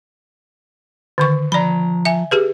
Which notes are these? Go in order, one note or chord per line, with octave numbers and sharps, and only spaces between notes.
D3 D#3 C#6
F3 D5 A#5 B5
E5 G#5
G4 G#4 B4